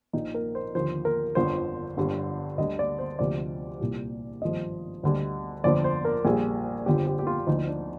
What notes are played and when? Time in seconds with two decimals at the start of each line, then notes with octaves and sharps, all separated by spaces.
0.13 A#1 A#2 F3 D#4
0.34 A#4
0.55 C5
0.75 D#2 D3 F3 C5
1.05 A#4
1.35 G1 F2 D3 F3 C5
1.97 G1 G2 D3 G3
2.58 D2 D3 G3 D#5
2.79 D5
2.99 C5
3.19 D2 C3 F3 D5
3.80 C2 A#2 G3
4.42 G#1 G2 F3 D#5
5.03 D2 D3 G3
5.64 G1 F2 D3 F3 D5
5.84 C5
6.05 A#4
6.25 A#1 A#2 G3 G#4
6.86 G1 F2 D3 F3 G4
7.07 G4
7.19 G4
7.27 F4
7.47 D2 D3 F3 D#4
7.68 D4